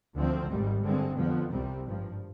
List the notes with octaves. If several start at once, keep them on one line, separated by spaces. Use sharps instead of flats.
D2 D3 F3 C4
G#1 G#2 G3
G2 D3 G#3 C4
F2 D3 F3 B3
C2 C3 G3 C4
G#1 G2 F3